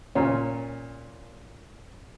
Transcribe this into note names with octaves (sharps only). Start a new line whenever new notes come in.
A#2 C#4